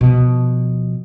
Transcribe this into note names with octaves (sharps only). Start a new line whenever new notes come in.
B2 F3